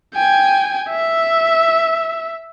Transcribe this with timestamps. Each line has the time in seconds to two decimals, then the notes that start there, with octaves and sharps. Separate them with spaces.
0.15 G5 G#5
0.90 E5